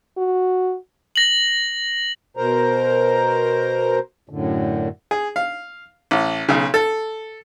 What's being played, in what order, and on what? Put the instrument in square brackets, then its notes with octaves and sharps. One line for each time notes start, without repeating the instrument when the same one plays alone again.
[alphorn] F#4
[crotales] A#6 F#7
[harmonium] B2 A#4 C5 A#5
F#2 A2 D3
[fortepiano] G#4
F5
A1
B1 C#3
A4